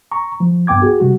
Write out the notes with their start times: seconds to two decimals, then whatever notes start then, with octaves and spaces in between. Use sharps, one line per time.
0.12 A#5 C#6
0.40 F3
0.67 C2 G2 B3 G5 D6 G#6
0.82 F#4 G#4
1.00 C3 G3 F#4